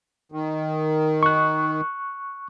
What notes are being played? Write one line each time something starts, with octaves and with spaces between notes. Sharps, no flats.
D#3
C#6 F#6